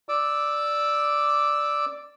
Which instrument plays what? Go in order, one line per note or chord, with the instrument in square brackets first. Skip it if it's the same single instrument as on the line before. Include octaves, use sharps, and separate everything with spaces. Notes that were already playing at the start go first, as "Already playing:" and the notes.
[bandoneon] D5 D6 E6